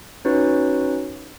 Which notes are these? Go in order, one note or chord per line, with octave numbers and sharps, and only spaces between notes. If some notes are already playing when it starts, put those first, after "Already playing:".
C#4 D#4 F#4 B4 C#5